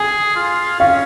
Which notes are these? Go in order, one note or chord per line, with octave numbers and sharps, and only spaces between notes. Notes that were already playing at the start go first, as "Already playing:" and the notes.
Already playing: G#4 G#5
F4
C#4 F5